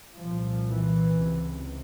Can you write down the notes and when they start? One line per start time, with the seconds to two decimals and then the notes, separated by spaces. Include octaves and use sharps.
0.19 C2 A#2 F3
0.69 E3
1.18 C#2 C3